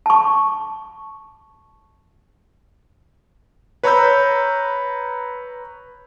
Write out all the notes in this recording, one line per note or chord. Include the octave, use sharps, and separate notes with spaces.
A5 C#6
B4 C#5 A#5 B5 E6 G6